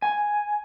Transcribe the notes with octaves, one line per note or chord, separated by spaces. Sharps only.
G#5